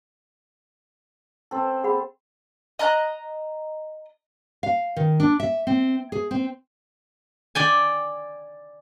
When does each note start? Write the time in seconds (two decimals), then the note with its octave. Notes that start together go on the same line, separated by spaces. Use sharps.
1.51 C4 A4
1.84 G#4 F#5 B5
2.79 D#5 A#5 F#6
4.63 F5
4.96 D#3
5.20 D4
5.40 E5
5.67 C4
6.12 G#4
6.31 C4
7.55 D5 G5 G#5